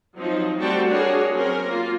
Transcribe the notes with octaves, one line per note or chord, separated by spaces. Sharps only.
F3 F#3 C4 D#4
G3 A3 C4 F#4 G5 A5
D4 F#4 G#4 A#4 C#5
F#3 C4 C#4 A#4
A#3 F4